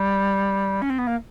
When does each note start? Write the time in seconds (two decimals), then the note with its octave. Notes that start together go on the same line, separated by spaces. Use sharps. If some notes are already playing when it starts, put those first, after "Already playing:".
Already playing: G3
0.82 C#4
0.90 C4
0.98 B3
1.07 A#3